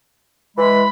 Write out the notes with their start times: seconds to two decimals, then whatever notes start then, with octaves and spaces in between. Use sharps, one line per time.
0.57 E3 G#3 B5